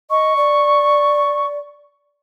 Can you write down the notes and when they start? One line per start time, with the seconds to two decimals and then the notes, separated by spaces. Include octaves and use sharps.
0.10 D#5 C#6
0.37 D5